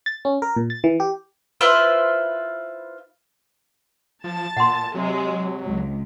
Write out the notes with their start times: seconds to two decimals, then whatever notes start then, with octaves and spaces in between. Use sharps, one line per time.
0.06 A6
0.25 C#4
0.42 A#4
0.56 A#2
0.70 A6
0.84 E3
1.00 G4
1.61 E4 F4 B4 C5
4.24 F3 A5 A6
4.57 A#2 F#5 C6
4.94 C3 F#3 G#3
5.64 C#2